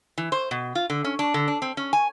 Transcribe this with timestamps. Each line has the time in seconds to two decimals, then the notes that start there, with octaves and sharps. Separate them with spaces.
0.18 E3
0.32 C5
0.51 B2
0.75 F4
0.90 D3
1.04 C#4
1.19 D4
1.34 D3
1.48 D4
1.62 C4
1.77 C#4
1.93 G#5